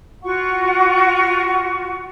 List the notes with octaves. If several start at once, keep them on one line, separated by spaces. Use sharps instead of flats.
F4 F#4 F#5 C#6